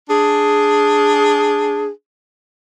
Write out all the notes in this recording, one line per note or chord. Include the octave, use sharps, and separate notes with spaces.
D4 G#4